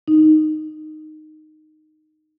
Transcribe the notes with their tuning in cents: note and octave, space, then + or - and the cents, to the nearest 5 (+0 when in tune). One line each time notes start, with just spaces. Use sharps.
D#4 -10